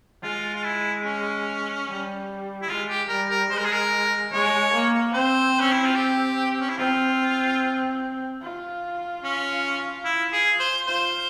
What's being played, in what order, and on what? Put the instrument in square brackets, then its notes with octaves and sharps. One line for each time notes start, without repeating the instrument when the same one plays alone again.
[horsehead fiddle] G#3 [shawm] F4
[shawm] F4
E4
C#4
[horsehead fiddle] G3
[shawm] E4
[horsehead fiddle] G#3 [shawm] F4
[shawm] G4
[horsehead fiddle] G3 [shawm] A#4
[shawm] A#4
[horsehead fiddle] G#3 [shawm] C5
[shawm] A#4
G#4
A#4
[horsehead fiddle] G#3 [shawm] C#5
[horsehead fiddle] A#3
[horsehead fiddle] C4 [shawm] C5
[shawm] C#4
E4
F4
G4
C#4
E4
[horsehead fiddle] C4 [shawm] F4
[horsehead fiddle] F4
[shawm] C#4
E4
G#4
C5
[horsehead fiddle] F4 [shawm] C5